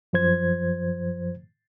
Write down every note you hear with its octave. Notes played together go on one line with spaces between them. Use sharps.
F#2 F3 C5 G#6